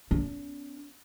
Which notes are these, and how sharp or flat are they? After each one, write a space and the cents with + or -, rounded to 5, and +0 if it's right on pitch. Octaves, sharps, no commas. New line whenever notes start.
B3 +45 D4 -45